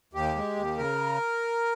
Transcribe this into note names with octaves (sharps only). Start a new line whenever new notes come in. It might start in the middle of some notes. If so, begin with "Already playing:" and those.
D#2 G4
G#3
D#2
C#3 A#4